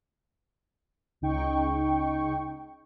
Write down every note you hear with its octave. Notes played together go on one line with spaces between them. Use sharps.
C#2 C#3 D#4 G5 C#6